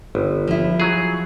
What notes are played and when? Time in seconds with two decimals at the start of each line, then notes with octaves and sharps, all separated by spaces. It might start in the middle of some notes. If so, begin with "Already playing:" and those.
0.15 G1
0.48 F3 E4
0.80 F#3 G#4